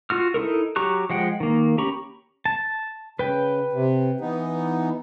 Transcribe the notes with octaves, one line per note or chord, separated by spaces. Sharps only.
F4 F#4 F6
D#4 E4 A4 A#4
F#3 G4 A#5 C#6 F#6
F3 G#3 F#5 G5
D#3 A#3
C#4 G4 A#5 B5 C#6
A5
C#3 B4 G5
C3
E3 B3 D#4